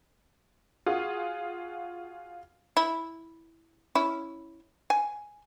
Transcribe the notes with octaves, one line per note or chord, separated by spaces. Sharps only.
F4 F#4 G#4
E4
C#4 E4
G#5